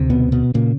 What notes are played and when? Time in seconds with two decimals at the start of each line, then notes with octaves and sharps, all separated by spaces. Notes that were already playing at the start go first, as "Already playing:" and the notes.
Already playing: D2 C3
0.10 B2 B3
0.32 B2 B3
0.54 A#2 C#3 A#3